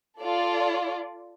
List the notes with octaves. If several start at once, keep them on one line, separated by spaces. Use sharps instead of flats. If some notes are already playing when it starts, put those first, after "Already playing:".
F4 A4 D5